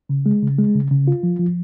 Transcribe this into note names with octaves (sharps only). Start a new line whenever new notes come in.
C#3
G#3
C#3
G#3
C#3
C#3
F4
F3
F3